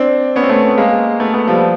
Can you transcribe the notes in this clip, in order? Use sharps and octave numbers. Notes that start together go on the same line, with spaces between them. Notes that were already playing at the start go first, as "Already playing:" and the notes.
Already playing: C4 D4
B3 C#4
C4
A3 B3
G#3 A#3
A3 B3
A3 B3
F3 G3